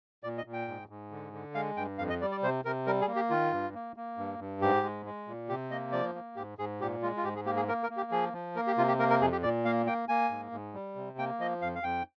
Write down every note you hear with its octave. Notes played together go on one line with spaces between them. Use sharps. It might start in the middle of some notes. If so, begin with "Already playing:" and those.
A#2 D5
D#5
A#2
G5
G#2
G#2
D3
D3
G#3 F5
G2 G5
F2 F5
D#5
G3 D5
D5
C3 C5
C3 A#4
G3 A#4
G#4
A#3
G4
D#3 F4
G2
A#3
A#3
G2
G2
G#2 G4
G#3
G#3
A#2
C3 G4
A#3 D#5
F3 D5
A#3
G#2 G4
G#2 G#4
A#2 G4
G#3 F4
F4
G#2 G4
G#4
A#3 G4
G#4
A#3 A#4
A#4
A#3
G4
F3 G#4
F3
A#3 A#4
G4
C3 F4
G4
A#3 A#4
A#4
F2 G#4
G4
A#2 D5
A#3 F5
A#3 G5
A#3 G#5
G#2
G#2
G3
C3
A#3 G5
F3 D#5
F2 F5
F5
F2 G5